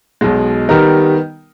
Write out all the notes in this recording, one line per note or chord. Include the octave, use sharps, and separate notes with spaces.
B1 B2 G#3
D#3 G3 B3 D#4 A#4